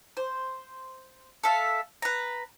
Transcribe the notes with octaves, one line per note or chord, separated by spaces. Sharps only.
C5
A4 E5 F5
B4 A#5